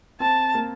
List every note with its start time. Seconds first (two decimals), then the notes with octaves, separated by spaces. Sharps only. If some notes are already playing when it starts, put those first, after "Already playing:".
0.20 C4 A5
0.54 A#3